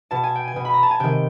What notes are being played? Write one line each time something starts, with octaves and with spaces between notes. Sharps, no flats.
B2 A5
G#5
G5
G#5
B2
B5
A#5
A5
G#5
C3 D#3 G5